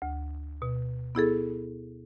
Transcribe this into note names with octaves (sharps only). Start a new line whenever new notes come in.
D2
B2
B3 E4 G#4 A4